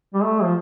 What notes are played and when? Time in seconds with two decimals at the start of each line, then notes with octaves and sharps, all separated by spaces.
0.14 G3
0.23 A3
0.43 F3